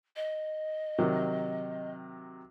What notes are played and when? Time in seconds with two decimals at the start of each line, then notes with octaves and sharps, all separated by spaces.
0.16 D#5
0.99 C3 D#3 F#3